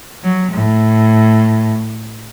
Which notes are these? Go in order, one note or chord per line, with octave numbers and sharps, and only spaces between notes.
F#3
A2